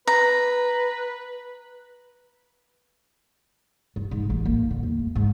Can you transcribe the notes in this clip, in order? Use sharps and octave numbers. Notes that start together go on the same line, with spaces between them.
B4 A#5
G2
G#2
A1
A#3
D3
E2
A3
G#2